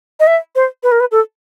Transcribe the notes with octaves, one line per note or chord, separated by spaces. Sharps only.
D#5
E5
C5
B4
A#4
B4
A4